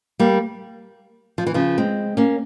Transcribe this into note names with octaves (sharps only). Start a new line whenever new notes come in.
G3 A#3
F3
E3
C#3 F3
G#3 C4
A#3 C#4